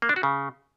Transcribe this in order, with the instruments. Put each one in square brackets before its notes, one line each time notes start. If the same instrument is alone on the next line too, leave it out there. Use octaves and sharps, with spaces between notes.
[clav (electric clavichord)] A#3
D4
F#4
C#3